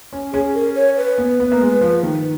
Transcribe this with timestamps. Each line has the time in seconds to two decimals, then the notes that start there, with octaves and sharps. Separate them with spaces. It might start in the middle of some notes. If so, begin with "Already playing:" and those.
0.13 C#4
0.33 C#4 G#4
0.55 A#4
0.75 C#5
0.97 B4
1.18 B3
1.40 B3
1.52 A#3
1.61 G#3
1.81 F3
2.03 D#3